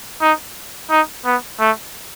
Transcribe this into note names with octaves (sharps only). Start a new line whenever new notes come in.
D#4
D#4
B3
A3